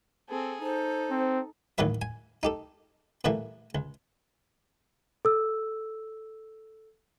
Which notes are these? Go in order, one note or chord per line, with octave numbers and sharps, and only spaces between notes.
C4 G#4 A4
D#4 A4 C5
C4
A1 D#2 A#2 F#3 B4 E5
G#5
D#4 G4 A4
A#2 E3 G3 A3 A#3
C#2
A4 E6